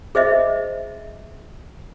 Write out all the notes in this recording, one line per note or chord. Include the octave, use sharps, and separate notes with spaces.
G#4 C5 D#5 E5